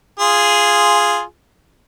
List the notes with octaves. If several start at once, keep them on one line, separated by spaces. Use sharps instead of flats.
F4 G#4